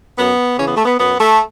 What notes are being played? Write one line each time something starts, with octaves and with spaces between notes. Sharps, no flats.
F#2 B3
C#3 E3 C#4
B3
A3
B3
F#2 B3
A3